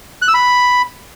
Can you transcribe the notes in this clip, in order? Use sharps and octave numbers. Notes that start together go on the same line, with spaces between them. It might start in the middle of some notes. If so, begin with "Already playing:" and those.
F#6
E6
B5